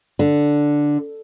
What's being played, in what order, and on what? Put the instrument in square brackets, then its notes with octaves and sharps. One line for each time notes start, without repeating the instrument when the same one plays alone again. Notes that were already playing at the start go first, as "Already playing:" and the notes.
[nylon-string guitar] D3